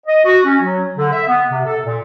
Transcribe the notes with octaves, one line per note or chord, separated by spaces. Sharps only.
D#5
F#4
C#4
F#3
D3
E5
B3
C3
A4
A#2